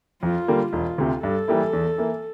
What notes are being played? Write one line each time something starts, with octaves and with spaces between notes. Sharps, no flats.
F2 F4
D3 G3 A#3
E1 F4
D2 C3
G2 A4
E3 G3 A#3 E4
E2
E3 A#3